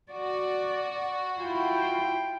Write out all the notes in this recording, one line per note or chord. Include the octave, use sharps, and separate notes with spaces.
F#4 D5
E4 F4 G5